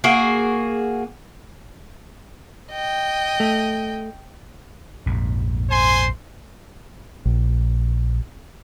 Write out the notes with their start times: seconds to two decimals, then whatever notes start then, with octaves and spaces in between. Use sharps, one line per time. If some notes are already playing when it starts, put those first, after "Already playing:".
0.04 A#3 F#4 G#4
2.72 D#5 G5
3.40 A3
5.06 A#1 F2 G#2
5.70 C5 G#5 C6
7.26 A#1